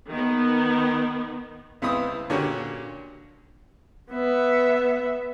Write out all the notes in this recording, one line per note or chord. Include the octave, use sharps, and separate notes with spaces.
D#3 B3
C#2 B3 C4 E4 B5 D#6
A#2 D3 C#4 D4 F#4 G4
B3 E5